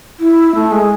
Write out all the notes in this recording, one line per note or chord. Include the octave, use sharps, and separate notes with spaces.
E4
A3
G#3